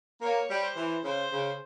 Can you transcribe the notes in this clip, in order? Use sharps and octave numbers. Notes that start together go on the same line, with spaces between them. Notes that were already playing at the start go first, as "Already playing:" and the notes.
A#3 C#5
G3
C5
E3
C#3 C5
C#3